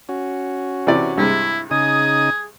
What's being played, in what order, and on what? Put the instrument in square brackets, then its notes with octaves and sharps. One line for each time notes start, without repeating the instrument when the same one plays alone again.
[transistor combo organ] C#4 F#4
[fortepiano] C3 E3 D5
[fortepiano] G2 C3 G#3 [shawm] E4
[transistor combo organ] C#3 D#4 D#6 [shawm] G#4